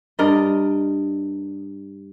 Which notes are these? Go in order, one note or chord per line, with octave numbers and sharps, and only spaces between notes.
G2 A#4 D5 D#5